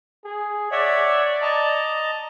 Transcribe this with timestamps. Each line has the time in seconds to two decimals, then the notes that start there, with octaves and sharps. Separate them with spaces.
0.24 G#4
0.72 C#5 D5 E5 F#5
1.42 D#5 A5 A#5